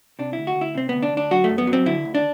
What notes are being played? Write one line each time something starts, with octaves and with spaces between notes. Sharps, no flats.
C3 D4
D2 E4
F#4
D2
E4
C3 C4
D2 B3
D4
D2
D4
F#3 F#4
A3
F#2
B3
F#3
C4
D3 E4
D2
D4